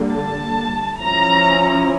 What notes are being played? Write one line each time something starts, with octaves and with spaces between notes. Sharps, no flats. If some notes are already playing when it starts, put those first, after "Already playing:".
Already playing: D3 G3 A#3
A5
F3 C#4 E4 A#5